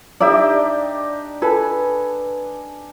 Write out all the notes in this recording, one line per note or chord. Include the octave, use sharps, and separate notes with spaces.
D4 D#4 G4 D5 E5
A4 B4 G#5